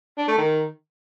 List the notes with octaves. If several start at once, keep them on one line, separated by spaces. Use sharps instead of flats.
D4
A3
D#3